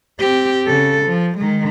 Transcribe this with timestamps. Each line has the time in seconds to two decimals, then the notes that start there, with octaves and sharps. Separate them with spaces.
0.20 C4 G4
0.67 C#3 A4
1.05 F3
1.38 D#3 G#3